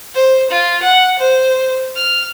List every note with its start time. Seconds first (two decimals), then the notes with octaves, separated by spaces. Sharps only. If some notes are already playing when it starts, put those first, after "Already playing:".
0.14 C5
0.50 F4
0.82 F#5
1.19 C5
1.96 F6